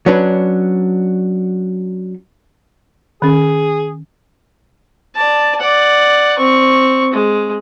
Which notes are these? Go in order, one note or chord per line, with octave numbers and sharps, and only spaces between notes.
F#3 C#4 D4 B4
D#3 C#4 G#4
D5 A5
D5 F#5
C4 C#6
G#3